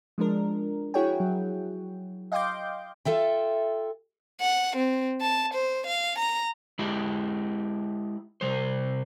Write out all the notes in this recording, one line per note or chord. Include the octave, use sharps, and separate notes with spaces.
F3 G#3 D4 A#4
E4 F#4 G#4 C#5 F#5 G5
F#3
D#5 F5 G5 C6 D6 G6
F4 A4 E5 G5
F#5
C4
A5
C5
F5
A#5
G#3 E4 G4
C3 G3 C5